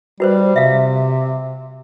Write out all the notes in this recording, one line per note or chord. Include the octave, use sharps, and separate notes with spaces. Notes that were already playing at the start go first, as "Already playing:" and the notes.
G3 F#4 B4 C5
C3 E5 F5